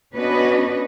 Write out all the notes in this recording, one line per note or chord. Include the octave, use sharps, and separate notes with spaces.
B3 C#4 D4 F#4 B4 D#5